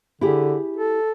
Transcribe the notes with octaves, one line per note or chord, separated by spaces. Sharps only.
D3 E4 G4 G#4
A4